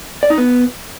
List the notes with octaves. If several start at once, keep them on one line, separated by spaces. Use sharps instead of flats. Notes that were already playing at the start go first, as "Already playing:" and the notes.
D5
D#4
B3